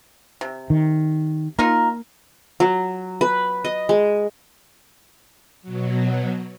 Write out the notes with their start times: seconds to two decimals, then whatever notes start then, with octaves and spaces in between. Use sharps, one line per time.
0.41 C3
0.70 D#3
1.59 A#3 D#4 F4 A#4
2.60 F#3
3.21 B4
3.65 D#5
3.89 G#3
5.62 B2 F#3